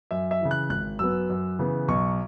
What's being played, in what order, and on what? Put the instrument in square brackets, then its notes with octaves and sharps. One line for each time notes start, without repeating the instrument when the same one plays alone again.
[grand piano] F#2 E5
E5
C#3 E3
F#6
G#1 F#6
F#2 F#3 B3 E6
F#2
C#3 E3 B3
B1 C#6